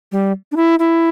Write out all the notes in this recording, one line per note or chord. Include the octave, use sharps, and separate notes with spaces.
G3
D4
E4
E4